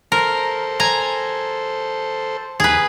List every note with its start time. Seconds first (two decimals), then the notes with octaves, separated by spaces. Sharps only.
0.12 A4 A#4 C5
0.80 G#5 A#5
2.60 D#2 G#4 B4 D#6